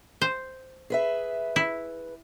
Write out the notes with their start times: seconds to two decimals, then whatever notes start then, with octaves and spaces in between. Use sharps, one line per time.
0.21 C5
0.90 G#4 B4 E5
1.56 E4